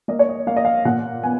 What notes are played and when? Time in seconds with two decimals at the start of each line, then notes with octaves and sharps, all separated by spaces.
0.08 A#3 D#5
0.19 C#5
0.29 D#5
0.47 A#3 F5
0.57 D#5
0.65 F5
0.85 A#2 F#5
1.23 B3 G#5